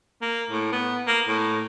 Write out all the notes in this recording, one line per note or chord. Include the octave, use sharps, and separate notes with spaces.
A#3
A2
B3
A#3
A2